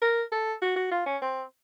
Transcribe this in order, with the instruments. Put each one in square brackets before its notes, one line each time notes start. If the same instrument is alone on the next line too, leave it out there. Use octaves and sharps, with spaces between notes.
[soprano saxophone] A#4
A4
F#4
F#4
F4
C#4
C4